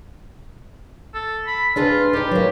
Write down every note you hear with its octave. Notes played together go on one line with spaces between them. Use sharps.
A4
B5
D4 F4 G#4 B4
D#4 G4 B4
F#3 A#3